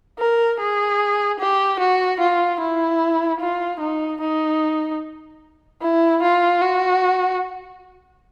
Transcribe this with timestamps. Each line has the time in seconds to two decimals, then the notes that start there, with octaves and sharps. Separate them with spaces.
0.19 A#4
0.59 G#4
1.40 G4
1.80 F#4
2.20 F4
2.60 E4
3.41 F4
3.81 D#4
4.21 D#4
5.81 E4
6.22 F4
6.61 F#4